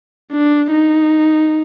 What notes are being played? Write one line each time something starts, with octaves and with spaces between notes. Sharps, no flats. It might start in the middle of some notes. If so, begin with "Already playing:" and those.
D4
D#4